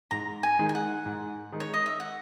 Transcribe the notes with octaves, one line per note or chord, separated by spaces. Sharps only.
G#2 A#5
G#5
D#3 G#3 D#4
G#5
F#5
G#2
D#3 G#3 D#4
C#5
D#5
E5
F#5